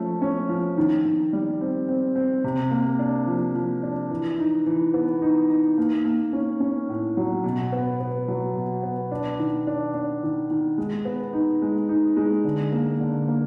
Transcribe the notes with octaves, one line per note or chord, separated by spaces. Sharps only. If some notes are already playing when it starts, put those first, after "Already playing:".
Already playing: F3 A3 C#4
C#4
F3
D#3
D#3
G3
C4
C4
C4
C3
A#3
D4
F3
F3
D4
E3
D#4
E3
B3
D#4
D#4
A#3
A#3
C#4
C#4
A2
F#3
B2
B3
B3
F#3
B2
B3
D4
D#3
D4
D4
D#3
D#3
G#3
B3
D#4
G#3
D#4
G#3
D3
A#3
D3
A#3